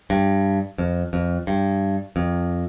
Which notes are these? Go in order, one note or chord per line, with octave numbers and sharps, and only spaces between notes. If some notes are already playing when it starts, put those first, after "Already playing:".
G2
F2
F2
G2
F2